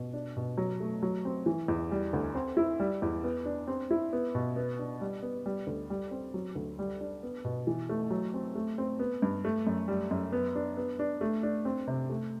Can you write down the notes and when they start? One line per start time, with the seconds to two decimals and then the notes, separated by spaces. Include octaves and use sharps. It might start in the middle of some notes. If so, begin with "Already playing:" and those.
Already playing: B2
0.13 D4
0.36 B2
0.58 F#3
0.80 A3
1.03 F#3
1.25 C4
1.46 E3
1.68 E2
1.91 G3
2.13 D2
2.35 C4
2.57 E4
2.80 G3
3.02 E2
3.24 B3
3.45 D4
3.68 C4
3.91 E4
4.13 B3
4.35 B2
4.56 B3
4.79 D4
5.01 G3
5.23 B3
5.46 G3
5.67 D2
5.90 G3
6.11 C4
6.34 F#3
6.55 D2
6.79 G3
7.01 D4
7.23 B3
7.45 B2
7.67 E3
7.89 A3
8.10 F#3
8.34 C4
8.55 A3
8.78 C4
8.99 B3
9.22 G2
9.45 A3
9.67 F#2
9.88 G3
10.11 F#2
10.32 B3
10.55 D4
10.77 B3
10.99 D4
11.21 A3
11.43 D4
11.65 C4
11.87 C3
12.10 A3